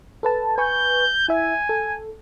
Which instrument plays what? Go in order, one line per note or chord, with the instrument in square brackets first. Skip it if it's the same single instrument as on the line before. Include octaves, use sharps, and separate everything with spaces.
[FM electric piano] A4 B4 A5
[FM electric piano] B4 G#5 C#6 [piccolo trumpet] G6
[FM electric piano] E4 E5 [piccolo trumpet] G#5
[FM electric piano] A4